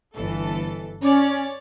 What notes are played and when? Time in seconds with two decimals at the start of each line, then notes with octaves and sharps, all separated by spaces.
0.14 G1 E3 A4
1.02 C#4 C#5 D5